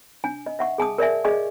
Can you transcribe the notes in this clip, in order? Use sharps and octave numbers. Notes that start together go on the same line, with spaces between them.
D4 G#5
D#5
E5 F#5 C#6
G#4 G#5 A5 D#6
A#4 D5 E5 G#5
G#4 D5 D#5 F5 G#5 C#6